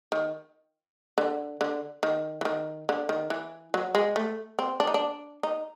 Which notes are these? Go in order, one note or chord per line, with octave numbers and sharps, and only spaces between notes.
D#3
D3
D3
D#3
E3
D#3
D3
D#3
E3
F#3
G#3
A3
C4
D4
D#4
D4
D#4